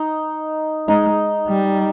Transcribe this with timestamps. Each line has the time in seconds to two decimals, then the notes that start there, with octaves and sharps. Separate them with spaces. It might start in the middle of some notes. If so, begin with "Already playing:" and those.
Already playing: D#4
0.88 G#3 D#4
1.48 G3